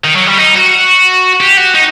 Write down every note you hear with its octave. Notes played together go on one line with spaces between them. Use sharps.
D#3
F#3
G3
D#4
F#4
G4
F#4
D#4